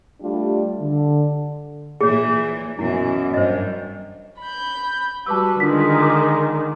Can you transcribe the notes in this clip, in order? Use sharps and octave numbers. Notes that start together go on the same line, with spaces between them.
G3 A3 D4 F4 G4
D3
A#2 E3 G#4 C#5
F#2 B2 E3 E4
G2 C5 D#5
B5 G6
G3 F#4 B4 A5 D6 E6
D3 D#3 G#3 D4 F4 B6
D6